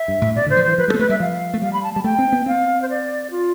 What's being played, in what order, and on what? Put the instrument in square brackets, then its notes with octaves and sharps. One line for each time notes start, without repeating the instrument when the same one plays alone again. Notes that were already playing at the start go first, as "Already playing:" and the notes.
Already playing: [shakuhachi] E5
[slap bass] G2
A2
[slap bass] B2 [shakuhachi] D5
[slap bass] D3 [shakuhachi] C5
[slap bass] F3
[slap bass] E3 [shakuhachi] C5
[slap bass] F3 [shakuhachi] B4
[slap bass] G3 [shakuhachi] A4
[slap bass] B3
[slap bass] A3 [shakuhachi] B4
[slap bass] G3 [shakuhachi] E5
[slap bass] F3 [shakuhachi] F5
[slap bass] A3
[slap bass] G3 [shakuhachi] F5
[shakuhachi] B5
A5
[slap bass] G3 [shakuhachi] A5
[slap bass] A3 [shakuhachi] G5
[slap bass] C4
B3
[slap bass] C4 [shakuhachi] F5
[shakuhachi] C5
D5
F4